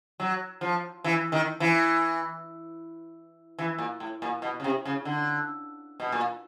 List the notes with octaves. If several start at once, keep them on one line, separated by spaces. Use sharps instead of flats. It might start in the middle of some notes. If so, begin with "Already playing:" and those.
F#3
F3
E3
D#3
E3
E3
A#2
A2
A#2
B2
C#3
C3
C#3
D3
B2
A#2